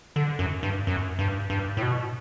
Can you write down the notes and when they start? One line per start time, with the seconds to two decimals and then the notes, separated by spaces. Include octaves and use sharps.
0.16 D3
0.39 F#2
0.63 G2
0.87 F#2
1.19 G2
1.50 G2
1.77 A2
1.82 B2